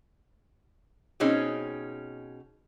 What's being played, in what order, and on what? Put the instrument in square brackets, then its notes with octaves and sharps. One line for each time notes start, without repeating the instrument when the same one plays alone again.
[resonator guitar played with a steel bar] B2 C4 C#4 D#4 G#4